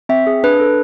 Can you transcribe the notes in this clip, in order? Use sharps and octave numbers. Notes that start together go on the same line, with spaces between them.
C4 E5
G#4
D4 B4
A4